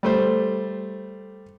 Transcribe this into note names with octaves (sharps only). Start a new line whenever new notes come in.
G3 A3 C5